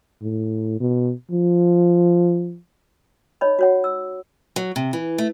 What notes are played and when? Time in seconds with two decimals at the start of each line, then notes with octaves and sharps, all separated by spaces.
0.22 A2
0.80 B2
1.31 F3
3.41 D#4 C#5 D#5 B5
3.59 F#4 C#5 F#5
3.84 E6
4.56 F#3
4.76 C3
4.93 E3
5.18 A3